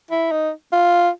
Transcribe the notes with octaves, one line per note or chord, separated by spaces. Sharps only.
E4
D#4
F4